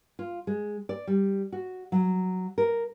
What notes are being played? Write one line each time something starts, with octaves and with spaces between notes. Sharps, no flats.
F4
G#3
D5
G3
F#4
F#3
A#4